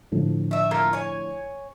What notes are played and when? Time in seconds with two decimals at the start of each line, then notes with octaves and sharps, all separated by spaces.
0.11 A2 D3 F3
0.51 A3 E5
0.71 A3 A#3 F4
0.93 C#5 G#5